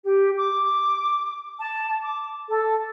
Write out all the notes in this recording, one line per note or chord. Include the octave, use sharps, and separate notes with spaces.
G4
D6
A5
D6
A4